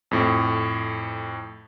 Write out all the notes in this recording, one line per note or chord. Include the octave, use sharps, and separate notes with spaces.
F2 A2